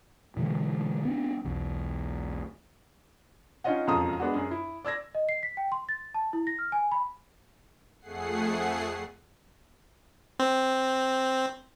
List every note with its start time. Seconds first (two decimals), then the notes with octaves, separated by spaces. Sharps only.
0.37 B2 D3 E3 G#3
1.05 B3 C4 D4
1.44 B1 E2
3.64 C#4 D#4 F4 C#5 D#5 F#5
3.87 E1 F2 C#3 F3 A#5 D#6
4.20 G#3 B3 D4 F#4
4.35 F#2 G#4
4.51 E4
4.85 D5 E6 G#6 A#6
5.15 D#5
5.29 C7
5.43 B6
5.57 G5
5.72 C6
5.89 A6
6.14 A5
6.33 E4
6.47 A#6
6.59 F6
6.72 G#5
6.92 B5
8.00 F2 A3 G#4 F#5 C7
10.40 C4